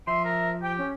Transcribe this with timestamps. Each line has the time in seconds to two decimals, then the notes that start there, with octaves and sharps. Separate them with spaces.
0.07 F3 E5 C6
0.25 A#4
0.62 G4 G5
0.78 C#4